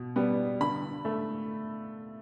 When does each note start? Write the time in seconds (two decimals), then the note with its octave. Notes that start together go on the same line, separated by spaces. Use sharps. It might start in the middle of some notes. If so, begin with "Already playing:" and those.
Already playing: B2
0.16 G3 B3
0.60 D3 B5
1.05 A3